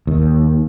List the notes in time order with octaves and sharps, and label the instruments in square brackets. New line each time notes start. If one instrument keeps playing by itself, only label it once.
[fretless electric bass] D#2